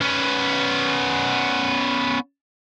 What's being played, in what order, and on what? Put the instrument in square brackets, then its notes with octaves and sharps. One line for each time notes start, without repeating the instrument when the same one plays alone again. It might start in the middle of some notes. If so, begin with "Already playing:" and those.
[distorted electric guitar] B3 C#4